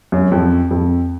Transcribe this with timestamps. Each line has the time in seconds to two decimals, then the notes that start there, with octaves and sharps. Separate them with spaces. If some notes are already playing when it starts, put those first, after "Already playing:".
0.12 F#2
0.32 F2
0.71 F2